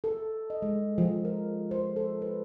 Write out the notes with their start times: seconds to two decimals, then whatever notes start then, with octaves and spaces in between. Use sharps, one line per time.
0.04 A4
0.50 D#5
0.62 G#3
0.98 F3
1.25 A#4
1.71 C5
1.96 A4
2.22 B4